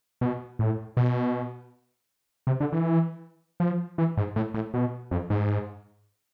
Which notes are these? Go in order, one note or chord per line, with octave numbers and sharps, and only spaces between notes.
B2
A2
B2
C3
D3
E3
F3
E3
G#2
A2
A2
B2
F2
G#2